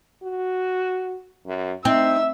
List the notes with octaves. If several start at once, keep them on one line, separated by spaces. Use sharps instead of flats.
F#4
F#2
C4 D#4 E5 E6